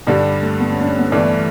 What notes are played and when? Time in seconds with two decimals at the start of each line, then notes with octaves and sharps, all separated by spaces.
0.07 G2 D3 G3 D4
0.42 A3
0.60 B3
0.72 C#4
0.81 D4
0.86 C#4
0.99 B3
1.12 G1 G2 E3 A3 D4